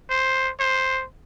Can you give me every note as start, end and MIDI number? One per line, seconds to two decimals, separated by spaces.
0.10 0.50 72
0.60 1.03 72